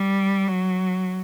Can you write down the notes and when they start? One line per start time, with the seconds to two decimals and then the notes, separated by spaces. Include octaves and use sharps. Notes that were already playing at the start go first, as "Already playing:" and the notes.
Already playing: G3
0.47 F#3